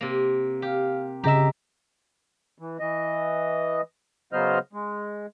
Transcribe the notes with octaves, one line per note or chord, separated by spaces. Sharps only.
C3 A#3
G4 F5
G1 C#3 G4 D#5 E5 A#5
E3
E3 D#5
C#3 F#3 B3 C5 D#5 F6
G#3